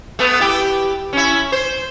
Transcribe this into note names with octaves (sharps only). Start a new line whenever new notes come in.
A3 B3
E4 G4
C#4 E4
C5